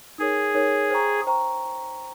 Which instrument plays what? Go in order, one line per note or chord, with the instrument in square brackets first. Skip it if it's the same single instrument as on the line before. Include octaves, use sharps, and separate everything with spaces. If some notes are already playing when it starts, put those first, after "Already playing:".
[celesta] D#4 A#4 C#5 [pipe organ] G#4
[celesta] D#4 A#4 C#5
C5 G5 A#5 C#6
C5 G5 A#5 C#6